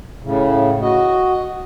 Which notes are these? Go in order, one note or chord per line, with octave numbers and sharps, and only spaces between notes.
A2 C#3
F#4 D#5